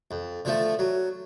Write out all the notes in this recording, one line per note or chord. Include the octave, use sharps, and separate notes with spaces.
F2
D3 F3 A3
F#3